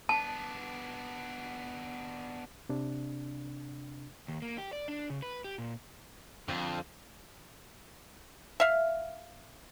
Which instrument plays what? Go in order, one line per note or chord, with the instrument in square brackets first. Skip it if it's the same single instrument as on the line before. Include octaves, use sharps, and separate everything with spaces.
[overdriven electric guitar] B3 D4 [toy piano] A5
[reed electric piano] C3 D4
[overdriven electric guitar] D#2
A#3
G4
D5
D4
C#3
B4
G4
A#2
[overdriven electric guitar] F2 [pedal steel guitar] D3 C4 F4
[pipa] E5 F5